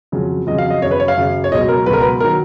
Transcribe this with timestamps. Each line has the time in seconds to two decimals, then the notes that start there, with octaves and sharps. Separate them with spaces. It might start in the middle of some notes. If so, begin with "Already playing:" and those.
0.12 F2 C#3 F#3
0.47 F2 C#3 F#3 D#5
0.58 F5
0.70 D#5
0.82 F#2 C#3 F#3 C#5
0.91 B4
1.00 C#5
1.08 F5
1.17 F#2 C#3 F#3
1.44 C#5
1.51 C#2 B2 F#3 D#5
1.69 A#4
1.86 C#2 B2 F#3 B4
1.93 A#4
2.02 B4
2.20 A#4
2.23 D#3 F#3